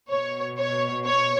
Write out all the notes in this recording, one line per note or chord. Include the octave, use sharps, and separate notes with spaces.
B2 C#5
C#5
C#5